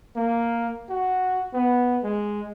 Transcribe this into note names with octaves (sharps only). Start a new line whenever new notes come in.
A#3
F#4
B3
G#3